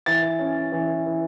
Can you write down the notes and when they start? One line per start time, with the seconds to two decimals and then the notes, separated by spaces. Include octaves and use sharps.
0.06 E3 A6
0.39 C#4
0.72 E3
1.06 E3